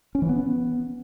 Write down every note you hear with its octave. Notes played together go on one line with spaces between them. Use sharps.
C#4
E3
B3